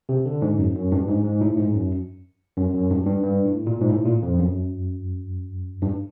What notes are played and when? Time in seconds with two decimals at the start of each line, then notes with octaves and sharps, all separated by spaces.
0.09 C3
0.25 D3
0.42 G#2
0.58 F#2
0.75 F#2
0.92 G2
1.08 G#2
1.24 G#2
1.41 A2
1.57 G#2
1.74 F#2
2.57 F#2
2.74 F#2
2.90 G2
3.06 G2
3.23 G2
3.45 A2
3.67 A#2
3.81 G#2
3.89 A2
4.05 A#2
4.22 F2
4.39 F#2
5.82 G2